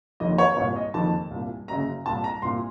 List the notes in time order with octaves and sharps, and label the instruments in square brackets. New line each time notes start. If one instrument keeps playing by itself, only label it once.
[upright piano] F#1 F2 D#3 D#5
C#5
A#2 C#5
C2
D#5
F#1 F2 D#3 A5
C2
A#2
F#1 F#2 C#3 A#5
C2 A#2 A5
A#5
C2 A#2 C6